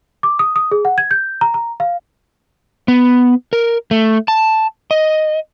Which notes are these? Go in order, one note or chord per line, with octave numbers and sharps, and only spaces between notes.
D6
D#6
D#6
G#4
F#5
G#6
G6
A#5
A#5
F5
B3
A#4
A3
A5
D#5